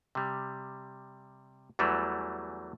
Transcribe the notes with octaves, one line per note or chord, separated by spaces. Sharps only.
C3 G3
E2 E3 F#3 G3 A3